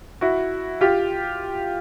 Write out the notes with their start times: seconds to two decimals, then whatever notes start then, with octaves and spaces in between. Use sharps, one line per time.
0.21 E4 F#4
0.81 F4 G4